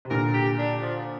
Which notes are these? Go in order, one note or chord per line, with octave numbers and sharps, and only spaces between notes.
C3
A#2 D3 A#4
G4
D4
F3